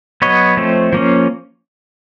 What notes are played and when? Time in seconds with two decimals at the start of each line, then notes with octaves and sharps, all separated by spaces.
0.22 F#3 B3 C#5 D#5
0.57 F3 A3 C4
0.93 F3 A#3 C#4